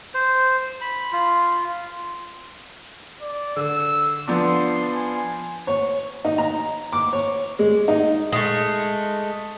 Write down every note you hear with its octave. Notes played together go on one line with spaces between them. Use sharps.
C5
B5
F4
D5
D3 E6
F3 B3 D4 C6
G#5
C#5
D#4
A#5
D6
C#5
G#3
D#4
G#3 A3